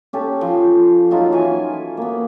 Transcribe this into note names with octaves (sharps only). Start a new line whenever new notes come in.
C#4 G4 A4
F3
F#3 D#4 F4 A4
E3 G#5
A#3 B3